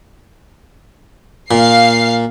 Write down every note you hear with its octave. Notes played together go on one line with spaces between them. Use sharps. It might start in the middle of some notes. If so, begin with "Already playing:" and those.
A#2 F5 C7